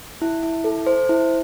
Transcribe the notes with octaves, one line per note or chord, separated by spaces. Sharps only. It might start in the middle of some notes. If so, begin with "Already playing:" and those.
E4
E4
A4
C5
E4